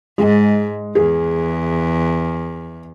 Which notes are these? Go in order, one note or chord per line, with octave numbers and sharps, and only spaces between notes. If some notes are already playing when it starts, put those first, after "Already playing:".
G#2 G#3
E2 G#4